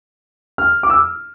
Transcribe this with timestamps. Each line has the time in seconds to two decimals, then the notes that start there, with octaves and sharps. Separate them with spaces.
0.58 F6
0.83 D6
0.90 E6